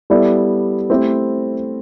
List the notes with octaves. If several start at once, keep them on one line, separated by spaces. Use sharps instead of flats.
G3 B3 E4 A4 D5
A3 C4 E4 G4 C5